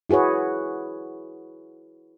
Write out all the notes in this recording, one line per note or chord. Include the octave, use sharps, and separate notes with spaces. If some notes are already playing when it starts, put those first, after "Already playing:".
E4 F#4 G#4 B4 C#5